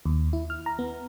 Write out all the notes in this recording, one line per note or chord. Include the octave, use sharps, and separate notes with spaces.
D#2
E4
F6
A#5
B3